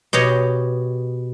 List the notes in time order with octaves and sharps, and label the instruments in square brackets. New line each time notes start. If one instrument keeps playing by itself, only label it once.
[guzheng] B2 G4 C#5 D#5